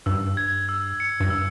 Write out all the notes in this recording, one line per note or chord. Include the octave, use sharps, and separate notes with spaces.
G2 E6
G#6
E6
C#7
G2
E6